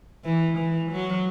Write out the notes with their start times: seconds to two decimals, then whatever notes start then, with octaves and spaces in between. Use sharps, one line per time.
0.25 E3
0.58 E3
0.92 F#3